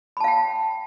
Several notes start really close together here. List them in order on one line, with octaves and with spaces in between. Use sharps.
B5 A5 F5 G5